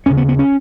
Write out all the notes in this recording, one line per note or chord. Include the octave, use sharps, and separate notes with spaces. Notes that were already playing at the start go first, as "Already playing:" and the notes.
D#2 C#3 C#4
B3
B3
C#4